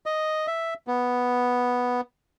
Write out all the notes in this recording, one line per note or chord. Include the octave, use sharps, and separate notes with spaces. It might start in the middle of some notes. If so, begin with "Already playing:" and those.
D#5
E5
B3